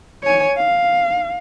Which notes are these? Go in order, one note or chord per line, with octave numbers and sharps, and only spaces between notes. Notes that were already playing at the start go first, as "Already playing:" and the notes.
C#5 G#5
F5